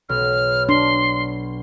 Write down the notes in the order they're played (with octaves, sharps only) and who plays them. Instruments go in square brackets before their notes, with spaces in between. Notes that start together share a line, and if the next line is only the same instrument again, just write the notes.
[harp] B1 [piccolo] F6
[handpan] D4 [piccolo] C6